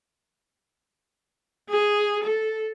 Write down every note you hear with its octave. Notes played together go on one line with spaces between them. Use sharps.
G#4
A4